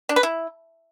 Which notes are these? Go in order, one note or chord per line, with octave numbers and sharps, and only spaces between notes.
D4
B4
E4